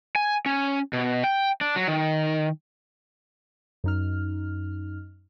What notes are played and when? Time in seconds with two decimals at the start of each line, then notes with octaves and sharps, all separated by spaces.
0.16 G#5
0.46 C#4
0.93 B2
1.24 G5
1.61 D4
1.76 F#3
1.88 D#3
3.84 F#2 D#4 F6